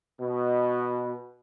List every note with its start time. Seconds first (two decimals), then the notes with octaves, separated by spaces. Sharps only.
0.20 B2